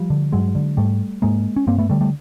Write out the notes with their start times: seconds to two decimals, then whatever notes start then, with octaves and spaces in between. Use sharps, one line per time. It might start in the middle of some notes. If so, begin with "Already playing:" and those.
Already playing: F3 G3
0.10 D3
0.32 G2 F#3 G#3
0.55 D3
0.77 G#2 G3 A3
1.22 G#2 G#3 A#3
1.56 C#4
1.67 G2 A#3 C4
1.78 A3 B3
1.89 D3 G3 A3
2.01 G3 A3